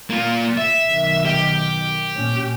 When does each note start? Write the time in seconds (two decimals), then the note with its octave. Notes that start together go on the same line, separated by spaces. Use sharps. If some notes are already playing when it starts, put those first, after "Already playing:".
0.10 A#3 F4
0.57 E5
0.87 B1 D#3
1.25 G4
2.14 A#2 C#4